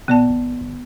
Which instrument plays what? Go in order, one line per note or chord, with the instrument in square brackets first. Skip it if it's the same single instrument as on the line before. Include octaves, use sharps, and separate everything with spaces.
[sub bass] A#2 [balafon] B3 D5 A5
[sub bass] G#1
G1